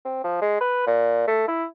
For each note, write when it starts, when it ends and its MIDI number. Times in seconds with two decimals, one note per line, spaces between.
0.05 0.20 60
0.24 0.41 53
0.42 0.59 56
0.61 0.85 71
0.87 1.24 46
1.27 1.47 57
1.48 1.65 64